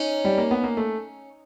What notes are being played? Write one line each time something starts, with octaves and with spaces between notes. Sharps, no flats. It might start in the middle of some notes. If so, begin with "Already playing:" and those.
Already playing: C#4 D#4
G3
A#3
B3
A#3
A3